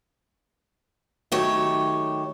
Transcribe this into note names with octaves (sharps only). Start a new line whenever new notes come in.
D#3 F#3 A3 G4 C#5